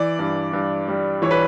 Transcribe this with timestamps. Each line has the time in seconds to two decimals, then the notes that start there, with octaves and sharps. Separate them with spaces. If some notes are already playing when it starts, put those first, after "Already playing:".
Already playing: E3 D5
0.19 G2
0.53 G2
0.88 G3
1.22 E3 C#5
1.31 B4